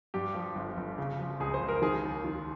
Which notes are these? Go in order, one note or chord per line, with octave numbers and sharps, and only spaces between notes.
G2 G4
F3
G1
G1
C#3
F3
C#2 G#4
C5
C#2
A#4
D#3 G#4
D#2
D#3